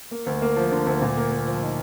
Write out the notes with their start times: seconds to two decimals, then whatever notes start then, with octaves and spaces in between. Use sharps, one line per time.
0.11 A#3
0.26 D2
0.42 A#3
0.56 F3
0.71 D3
0.87 D2
1.02 A#2
1.17 A#3
1.31 A#3
1.47 F3
1.62 D#4